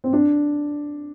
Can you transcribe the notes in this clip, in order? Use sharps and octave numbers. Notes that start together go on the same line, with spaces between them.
C4
D4